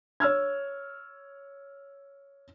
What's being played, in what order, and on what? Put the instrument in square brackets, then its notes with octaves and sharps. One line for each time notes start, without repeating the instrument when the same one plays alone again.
[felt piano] C#5 E6 F6 G#6